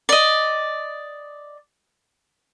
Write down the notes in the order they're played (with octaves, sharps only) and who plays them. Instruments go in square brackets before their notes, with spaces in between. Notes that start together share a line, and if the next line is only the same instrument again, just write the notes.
[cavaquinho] D5 D#5